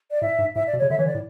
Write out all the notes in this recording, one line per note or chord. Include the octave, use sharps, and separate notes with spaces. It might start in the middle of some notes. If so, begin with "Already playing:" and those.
D5
A2 E5
G#2
A2 E5
D5
B2
C#5
C#3
D3 E5
E3 C#5
D3 D5
A2